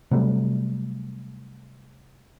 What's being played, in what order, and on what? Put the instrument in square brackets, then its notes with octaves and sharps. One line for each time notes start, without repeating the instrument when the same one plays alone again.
[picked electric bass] C3 F#3 G3 A3